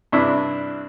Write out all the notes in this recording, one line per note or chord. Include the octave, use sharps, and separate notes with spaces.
G2 C3 D4 E4